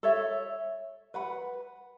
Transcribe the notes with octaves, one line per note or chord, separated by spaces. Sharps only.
A4 C#5 E5
B4 F#5 B5